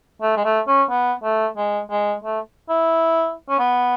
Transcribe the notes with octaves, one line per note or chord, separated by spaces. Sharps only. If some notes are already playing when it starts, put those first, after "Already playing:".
A3
G#3
A3
C#4
B3
A3
G#3
G#3
A3
E4
C#4
B3